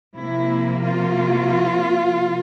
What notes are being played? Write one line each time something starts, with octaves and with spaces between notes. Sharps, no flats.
C3 F3 A#3 E4
F4